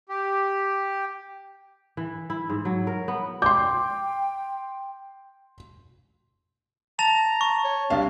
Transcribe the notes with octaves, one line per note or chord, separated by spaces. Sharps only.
G4
E3
E4
G#2
F#3
A#4
B3
G5 C6 D6 G6
A5 A#5 A6 F7
C#6
C#5
C2 C4 D4 F5